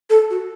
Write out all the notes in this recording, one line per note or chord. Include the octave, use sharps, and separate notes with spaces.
A4
F#4